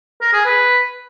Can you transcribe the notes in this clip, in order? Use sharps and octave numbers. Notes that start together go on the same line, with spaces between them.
A#4
G#4
B4